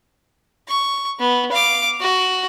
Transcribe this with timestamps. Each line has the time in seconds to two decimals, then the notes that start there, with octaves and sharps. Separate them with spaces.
0.68 C#6
1.20 B3
1.52 F5 D6
2.01 F#4